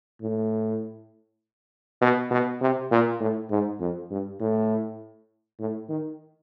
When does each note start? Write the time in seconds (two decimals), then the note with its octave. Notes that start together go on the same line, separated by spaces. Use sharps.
0.22 A2
2.01 B2
2.31 B2
2.61 C3
2.91 A#2
3.20 A2
3.50 G#2
3.80 F2
4.11 G2
4.40 A2
5.59 A2
5.89 D#3